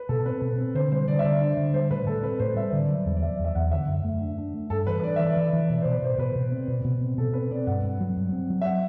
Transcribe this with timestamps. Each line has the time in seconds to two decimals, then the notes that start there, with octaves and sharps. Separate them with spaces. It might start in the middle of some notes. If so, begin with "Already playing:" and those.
Already playing: B4
0.09 B2 A4
0.19 A4
0.26 C4 B4
0.42 B2
0.58 C4
0.74 D3 C5
0.92 G3 C5
1.08 D3 D5
1.19 E5
1.24 D3 D5
1.41 D4
1.57 D3
1.73 G3 C5
1.90 A2 B4
2.07 A2 A4
2.23 C4 B4
2.39 A2 C5
2.56 G3 E5
2.72 D3 D5
2.89 F#3
3.05 E2
3.16 D5
3.22 F#3 E5
3.39 E2
3.44 E5
3.55 E2 F#5
3.71 D3 E5
3.88 F#2
4.04 A3
4.21 D4
4.38 D4
4.54 A3
4.70 G2 A4
4.87 E3 B4
5.03 D4 D5
5.16 E3 E5
5.28 D5
5.37 E3
5.53 E3
5.69 B2 D5
5.82 B2 C5
5.93 B4
6.02 B2 C5
6.18 B2 B4
6.35 B2
6.52 C4
6.68 B2
6.84 B2
7.01 C4
7.18 B2 A4
7.33 C4 B4
7.51 C4 D5
7.67 G2 F#5
7.83 G2
8.00 F#3
8.16 G2
8.33 C4
8.50 F#3
8.61 E5
8.66 F#5